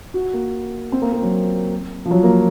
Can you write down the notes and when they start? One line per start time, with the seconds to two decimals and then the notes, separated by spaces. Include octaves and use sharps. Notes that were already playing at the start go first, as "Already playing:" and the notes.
0.14 F#4
0.33 A#3
0.92 C4
1.02 A#3
1.13 A#3
1.22 F#3
2.05 F3
2.11 F#3
2.23 A#3